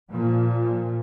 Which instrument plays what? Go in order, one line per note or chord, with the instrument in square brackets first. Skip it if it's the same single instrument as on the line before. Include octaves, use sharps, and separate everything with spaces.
[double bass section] A#2 F3